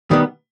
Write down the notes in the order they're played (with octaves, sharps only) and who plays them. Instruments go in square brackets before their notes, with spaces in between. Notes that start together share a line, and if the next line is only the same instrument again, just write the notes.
[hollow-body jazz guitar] D#3 G3 B3